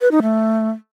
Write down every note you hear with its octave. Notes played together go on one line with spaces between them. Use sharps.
B4
D#4
A3